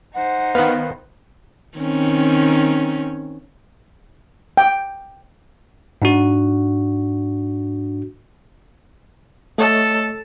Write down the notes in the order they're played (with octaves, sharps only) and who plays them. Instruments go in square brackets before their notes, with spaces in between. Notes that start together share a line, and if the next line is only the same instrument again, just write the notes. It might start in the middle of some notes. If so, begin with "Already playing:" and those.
[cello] D#4 C5 [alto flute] F#5
[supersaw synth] D#3 B3 [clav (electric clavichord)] B4 F5
[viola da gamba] D#3 C4 C#4
[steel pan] G5
[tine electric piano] G#2 D4 F#4
[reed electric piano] A3 C#5 D#5 [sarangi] A4